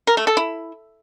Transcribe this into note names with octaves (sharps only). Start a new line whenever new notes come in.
A#4
A3
A4
E4